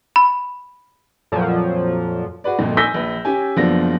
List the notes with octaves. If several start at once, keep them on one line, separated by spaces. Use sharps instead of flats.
B5
F2 A#2 F3 F#3
F#4 G#4 B4 D5
G1 F2 A#2
G#5 E6 G6 A#6 B6 G7
A#1 B4
C#4 G4 G#5
F#1 F3 B3 D4 F4 A#6